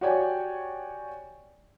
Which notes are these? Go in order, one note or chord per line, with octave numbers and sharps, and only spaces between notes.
F#4 G4 C#5 D5 G5 G#5